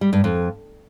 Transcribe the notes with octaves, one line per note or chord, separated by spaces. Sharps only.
G3
G2
F2